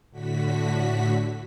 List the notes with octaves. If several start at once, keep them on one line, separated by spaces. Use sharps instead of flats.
A2 D3 F#4 B6